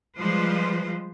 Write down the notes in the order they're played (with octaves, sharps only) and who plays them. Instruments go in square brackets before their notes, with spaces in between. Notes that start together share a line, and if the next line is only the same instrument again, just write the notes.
[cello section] F3 G3 G#3 F4 B4 C5